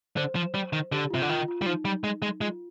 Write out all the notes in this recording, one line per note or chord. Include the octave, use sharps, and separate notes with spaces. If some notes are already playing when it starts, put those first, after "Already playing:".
D3 C5
F3
G3
D#3
D3 G4
C3 F4
D3
D#3 F4
F4
G3
F3 D#4
G3
G#3
G#3
G#3 F4